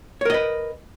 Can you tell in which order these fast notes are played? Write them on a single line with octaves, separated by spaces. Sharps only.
C#5 A#4 D#5 B4